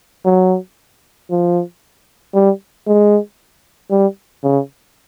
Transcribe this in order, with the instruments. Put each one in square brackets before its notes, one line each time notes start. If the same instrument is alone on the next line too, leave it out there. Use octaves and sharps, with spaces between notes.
[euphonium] F#3
F3
G3
G#3
G3
C#3